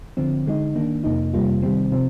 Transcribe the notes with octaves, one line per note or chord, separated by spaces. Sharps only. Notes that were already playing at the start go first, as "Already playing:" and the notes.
D3 F3 C4
D3 G#3 D#4
D#3 A#3 D4
F2 C3 F3 A#3 D#4
F2 C3 G3 A#3 F4
C3 D#3 G3 C4
C3 F3 C4